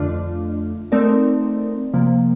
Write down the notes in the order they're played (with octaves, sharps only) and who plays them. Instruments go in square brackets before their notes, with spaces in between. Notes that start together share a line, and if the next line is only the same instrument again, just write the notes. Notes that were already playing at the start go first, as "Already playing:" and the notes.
Already playing: [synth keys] F2 D3 A3 D4 F4
A3 C4 D#4 A#4 D5
C3 F3 A#3